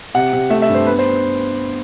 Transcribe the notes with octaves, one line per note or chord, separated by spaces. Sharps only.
C3 F#5
C3
A3 E5
E5
G2
C5
B3 B4
C5